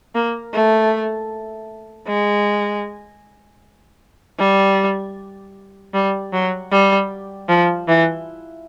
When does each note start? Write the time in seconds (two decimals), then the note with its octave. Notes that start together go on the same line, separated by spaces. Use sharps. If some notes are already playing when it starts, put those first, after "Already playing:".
0.15 A#3
0.54 A3
2.08 G#3
4.39 G3
5.94 G3
6.33 F#3
6.71 G3
7.49 F3
7.88 E3